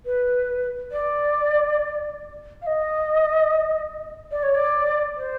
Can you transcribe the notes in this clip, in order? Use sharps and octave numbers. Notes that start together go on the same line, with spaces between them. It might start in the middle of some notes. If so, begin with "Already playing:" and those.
B4
D5
F5
D#5
D5
C#5
D5
C5